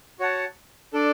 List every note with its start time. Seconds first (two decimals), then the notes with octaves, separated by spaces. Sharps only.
0.19 F#4 C#5 F#5 A5
0.93 D4 A4 D5